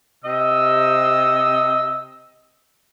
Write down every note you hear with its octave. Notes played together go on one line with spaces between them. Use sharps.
C3 D#5 E6